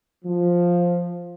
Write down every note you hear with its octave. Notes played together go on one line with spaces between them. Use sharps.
F3